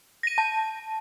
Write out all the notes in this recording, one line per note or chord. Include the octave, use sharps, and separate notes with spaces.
A#6 D#7
A5